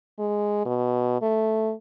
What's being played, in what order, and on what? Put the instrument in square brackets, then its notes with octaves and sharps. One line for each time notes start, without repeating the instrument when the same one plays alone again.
[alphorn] G#3
B2
A3